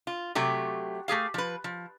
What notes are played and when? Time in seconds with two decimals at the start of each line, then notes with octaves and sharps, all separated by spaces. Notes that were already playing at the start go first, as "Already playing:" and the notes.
0.07 F4
0.35 C3 F#3 A3 G4
1.08 A3 G4 G#4 F5
1.34 F3 B4
1.64 F3